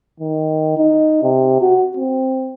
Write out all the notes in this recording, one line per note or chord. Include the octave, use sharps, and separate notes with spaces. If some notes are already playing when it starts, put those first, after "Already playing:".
D#3
D#4
C3
F#4
C4